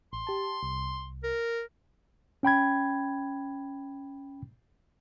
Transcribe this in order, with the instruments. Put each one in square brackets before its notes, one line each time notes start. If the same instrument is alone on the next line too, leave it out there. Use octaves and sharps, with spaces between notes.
[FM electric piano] A1 [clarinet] C6
[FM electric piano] G4 A5
C2
[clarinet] A#4
[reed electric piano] C#4 G5 B5 G#6